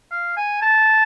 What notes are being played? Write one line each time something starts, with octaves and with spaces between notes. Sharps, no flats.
F5
G#5
A5